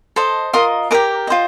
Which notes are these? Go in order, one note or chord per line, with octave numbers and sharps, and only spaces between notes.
A4 C5 D#5
F4 A#4 D#5 C6 D#6
G4 A#4 D#5 A#5 D6
F4 C5 D#5